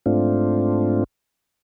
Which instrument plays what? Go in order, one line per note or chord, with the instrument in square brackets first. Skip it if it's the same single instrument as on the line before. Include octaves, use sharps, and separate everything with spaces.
[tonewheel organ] G#2 A3 C4 D4 F4